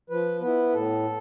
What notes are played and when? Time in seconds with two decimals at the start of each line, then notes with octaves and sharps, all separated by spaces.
0.10 F3 B4
0.41 B3 E4 B4
0.74 A2 A4